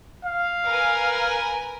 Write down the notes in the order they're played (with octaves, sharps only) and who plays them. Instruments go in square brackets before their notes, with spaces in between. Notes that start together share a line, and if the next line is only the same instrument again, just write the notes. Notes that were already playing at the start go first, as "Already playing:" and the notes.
[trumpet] F5
[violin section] A#4 B4 G#5